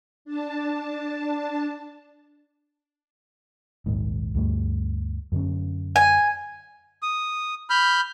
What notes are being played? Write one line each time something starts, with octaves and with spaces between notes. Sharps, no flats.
D4 A5
A#1 D#2 G#2
D2 G2 A3
F#2 D3 C#4
G#5
D#6
B5 F6 G6